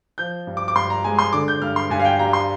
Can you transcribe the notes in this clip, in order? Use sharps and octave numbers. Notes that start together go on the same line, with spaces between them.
F3 G6
G2
D6
D6
G2 C6
A#5
G#3 G#5
C6
D3 D6
G6
G2 F6
C6
G2 G#5
F5
G5
G3 A#5
C6